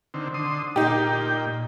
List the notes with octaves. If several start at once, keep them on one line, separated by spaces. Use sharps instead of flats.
D3 D#3 C4
D3 C6 D#6
A#2 D#4 G4 G5